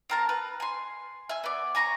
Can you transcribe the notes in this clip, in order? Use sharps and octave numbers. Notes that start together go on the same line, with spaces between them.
C4 A#4 A5
B4
G#5 C6
E5 G#5
B3 D5
G#5 A#5 B5 C#6